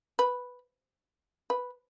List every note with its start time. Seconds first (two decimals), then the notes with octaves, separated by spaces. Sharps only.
0.19 B4
1.50 B4